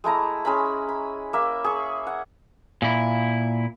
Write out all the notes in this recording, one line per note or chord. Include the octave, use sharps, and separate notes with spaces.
G#3 A3 E4 A#5
G#3 C#4 A#5 B5
B5
A#3 E5
G#4 C#6
F#5
A#2 E4